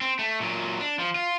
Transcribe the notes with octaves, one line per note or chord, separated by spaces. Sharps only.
C4
A3
A#2 F#3
D4
F3
F4